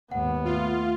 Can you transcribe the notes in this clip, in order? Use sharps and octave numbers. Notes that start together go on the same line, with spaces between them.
D#2 G#2 B3 F#5
A3 F4